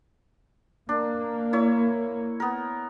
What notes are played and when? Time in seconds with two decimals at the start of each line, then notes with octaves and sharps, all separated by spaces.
0.89 A#3 D4
1.53 E4 C#5
2.40 B3 A#4